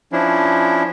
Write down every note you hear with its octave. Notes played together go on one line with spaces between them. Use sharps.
F3 C#4 D4 E4